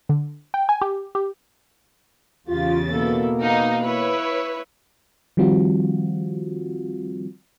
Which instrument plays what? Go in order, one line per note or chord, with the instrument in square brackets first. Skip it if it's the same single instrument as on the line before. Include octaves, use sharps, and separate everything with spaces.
[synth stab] D3
G5
G#5
G4
G4
[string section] E2 C#3 A6 [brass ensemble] F4 [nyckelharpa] G4
[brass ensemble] B2 A#3 [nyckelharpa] E4 A4
[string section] D#4 [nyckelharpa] D#5 F5
[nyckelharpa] E4 [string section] B4 C#5
[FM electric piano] D#3 F3 G3 C4 F4 F#4